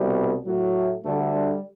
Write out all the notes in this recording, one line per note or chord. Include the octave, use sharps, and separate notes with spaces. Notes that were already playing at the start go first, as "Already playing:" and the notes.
Already playing: C2 B2 G3
A2 F#3
D2 D3 G3 A3
G3